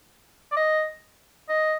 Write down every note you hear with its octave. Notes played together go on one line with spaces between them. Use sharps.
D5
D#5
D#5